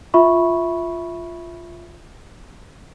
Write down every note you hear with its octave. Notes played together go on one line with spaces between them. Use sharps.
F4 E5 B5 C#6